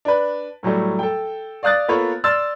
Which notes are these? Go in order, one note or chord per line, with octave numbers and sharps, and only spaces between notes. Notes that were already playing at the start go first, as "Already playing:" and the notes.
D4 B4
A2 F#3 G3 A3
A4 G5
D5 F5 D#6 F#6 A6
A#3 B3 F4 A4 B4 C#5
D5 C6 E6 F6 A6